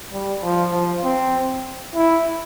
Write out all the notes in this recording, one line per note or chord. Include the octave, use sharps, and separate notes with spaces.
G3
F3
F3
C4
E4